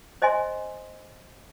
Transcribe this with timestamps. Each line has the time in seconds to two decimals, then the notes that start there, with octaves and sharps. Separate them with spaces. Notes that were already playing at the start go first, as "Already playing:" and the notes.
0.22 C5 D#5 E5 G#5 C6